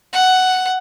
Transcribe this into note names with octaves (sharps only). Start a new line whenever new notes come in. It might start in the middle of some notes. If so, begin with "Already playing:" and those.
F#5